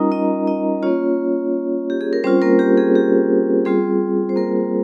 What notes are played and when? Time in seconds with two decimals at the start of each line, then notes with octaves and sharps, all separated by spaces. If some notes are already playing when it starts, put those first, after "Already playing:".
Already playing: G3 C#4 D#4 F4 A#4 D#5 A#5
0.11 D#4 D#5
0.47 D#4 D#5
0.83 A#3 C#4 F4 C#5
1.90 G4
2.01 G#4
2.13 A#4
2.24 G3 C4 C#4 F4 C5
2.42 A#3 A#4
2.59 G4
2.77 G#4
2.95 G4
3.65 G3 C4 F4 G#4
4.29 C5
4.36 A#3 A#4